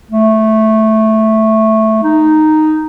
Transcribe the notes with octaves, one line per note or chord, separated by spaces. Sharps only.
A3
D#4